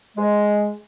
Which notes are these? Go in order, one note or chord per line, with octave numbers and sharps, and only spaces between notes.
G#3